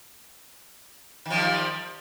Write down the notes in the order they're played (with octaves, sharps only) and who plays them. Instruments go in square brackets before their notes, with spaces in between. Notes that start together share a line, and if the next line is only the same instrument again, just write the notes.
[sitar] D#3
F3
G3